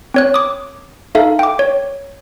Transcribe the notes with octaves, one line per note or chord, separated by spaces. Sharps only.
C4 C#5 F#6
D6 D#6
D#4 A4 E5 F5
G5 D6
C#5